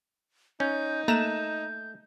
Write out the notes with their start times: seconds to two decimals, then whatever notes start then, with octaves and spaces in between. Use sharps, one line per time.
0.60 C#4 D#4 G6
1.08 A3 A#3 A#5 F#6 G6 E7